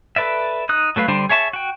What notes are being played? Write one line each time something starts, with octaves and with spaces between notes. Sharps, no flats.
A4 B4 D5 E5
D#4 D#6 F#6
F#3 A3 B4 F5
D3 G3 D4 C5
G#4 C#5 E5 A5 C#6
F#4 G5